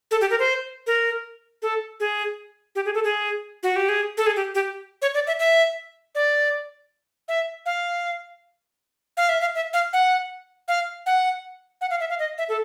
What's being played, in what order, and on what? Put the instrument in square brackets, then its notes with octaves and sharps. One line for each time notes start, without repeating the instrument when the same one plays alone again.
[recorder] A4
G4
A#4
C5
A#4
A4
G#4
G4
G#4
A4
G#4
F#4
G4
G#4
A4
G#4
G4
G4
C#5
D5
E5
E5
D5
E5
F5
F5
E5
F5
E5
F5
F#5
F5
F#5
F#5
F5
E5
F5
D#5
E5
A4